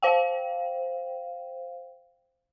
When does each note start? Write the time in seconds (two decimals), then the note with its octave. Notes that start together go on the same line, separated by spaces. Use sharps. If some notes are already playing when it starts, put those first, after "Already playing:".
0.02 C5 F5 G5